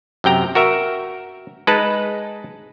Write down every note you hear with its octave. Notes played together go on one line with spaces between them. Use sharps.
F#2 C3 G5 A#5
F#4 A#4 E5
G#3 D#4 B4 A5